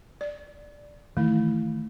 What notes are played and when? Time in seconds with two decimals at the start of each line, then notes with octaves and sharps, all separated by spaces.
0.21 D5
1.17 D#3 E3 A3 E4